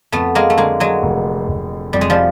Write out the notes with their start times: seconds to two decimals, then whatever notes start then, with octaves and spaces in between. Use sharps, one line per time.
0.12 F2 A3 B3
0.35 G#3 A#3
0.50 A3
0.58 D3 G#3 A#3
0.80 F#3 G#3
1.03 F1
1.48 F1
1.93 F2 G3
2.01 G#3
2.10 F3 G3